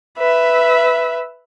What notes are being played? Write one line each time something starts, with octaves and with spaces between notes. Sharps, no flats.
B4 E5